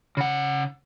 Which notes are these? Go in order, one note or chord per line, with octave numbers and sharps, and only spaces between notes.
C#3 F#5